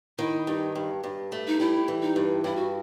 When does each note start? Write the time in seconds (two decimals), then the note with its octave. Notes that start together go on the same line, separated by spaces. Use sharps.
0.18 D#3 E4
0.47 G2 D#4
0.75 G2
1.04 G2
1.32 A3
1.47 D#4
1.60 G3 E4
1.88 E3
2.02 D#4
2.16 G2
2.44 G2 E4
2.56 F#4